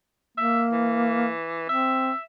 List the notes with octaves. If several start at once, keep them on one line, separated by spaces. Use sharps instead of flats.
A#3 E5
E3
C4 E5